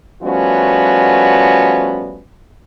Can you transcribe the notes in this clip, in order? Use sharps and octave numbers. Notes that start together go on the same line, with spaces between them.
F3 G3 A3 B3 C#4 F#4